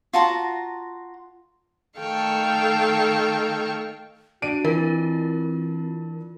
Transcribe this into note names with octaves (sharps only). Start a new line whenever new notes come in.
F4 F#4 A5 A#5
D#3 A3 A4 F5 G5 C#6
D4 F#4 D7 D#7
E3 C4 F4 A#4